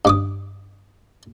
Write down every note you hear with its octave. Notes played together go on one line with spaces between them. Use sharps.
G2 D6 D#6